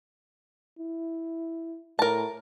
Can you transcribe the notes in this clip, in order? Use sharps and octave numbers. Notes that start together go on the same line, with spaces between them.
E4
A2 A#4 A5